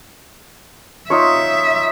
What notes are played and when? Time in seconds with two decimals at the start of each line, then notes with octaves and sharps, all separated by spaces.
1.10 D#4 F4 C#5 E5